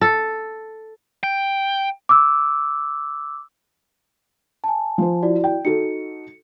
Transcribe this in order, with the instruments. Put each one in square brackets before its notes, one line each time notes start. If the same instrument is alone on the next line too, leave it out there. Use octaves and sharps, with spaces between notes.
[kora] A4
[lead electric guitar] G5
[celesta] D6 E6
G#5 A5
[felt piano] F3 C5
[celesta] E4 F#4 D5
[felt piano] G5
[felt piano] D#4 F#4 A4 [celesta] C#7